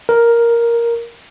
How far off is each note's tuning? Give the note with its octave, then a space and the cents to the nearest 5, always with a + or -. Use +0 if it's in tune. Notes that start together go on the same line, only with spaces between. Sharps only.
A#4 +5